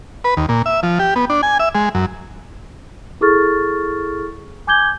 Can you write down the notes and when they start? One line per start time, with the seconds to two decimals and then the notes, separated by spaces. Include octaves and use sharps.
0.24 B4
0.37 D#2
0.49 A#2
0.66 E5
0.83 F3
0.99 G4
1.16 B3
1.30 D4
1.43 G#5
1.60 E5
1.75 G#3
1.95 F#2
3.21 E4 G#4 A4 C#6 F6 A6
4.67 G#5 D6 G6 G#6 G7